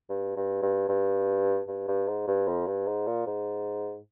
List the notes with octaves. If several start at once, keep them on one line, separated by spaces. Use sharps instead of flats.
G2
G2
G2
G2
G2
G2
G#2
G2
F2
G2
G#2
A#2
G#2